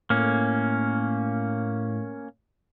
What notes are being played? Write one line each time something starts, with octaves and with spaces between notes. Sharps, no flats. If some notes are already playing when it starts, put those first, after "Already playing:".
A2 A#3 C#4